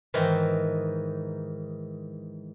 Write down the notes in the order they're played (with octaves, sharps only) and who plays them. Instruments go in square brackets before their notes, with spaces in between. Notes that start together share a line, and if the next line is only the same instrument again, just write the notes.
[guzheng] G#2 D#3 E3